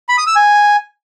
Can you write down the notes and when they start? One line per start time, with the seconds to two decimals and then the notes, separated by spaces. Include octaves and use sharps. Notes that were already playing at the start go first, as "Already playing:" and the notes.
0.09 B5
0.18 D#6
0.27 E6
0.36 G#5